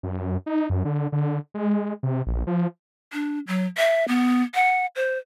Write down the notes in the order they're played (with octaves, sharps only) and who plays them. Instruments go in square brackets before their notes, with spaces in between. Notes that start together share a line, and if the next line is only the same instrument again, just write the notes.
[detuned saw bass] F#2
D#4
F#2
D3
D3
G#3
C3
A#1
F3
[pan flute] D4
F#3
E5
B3
F#5
C5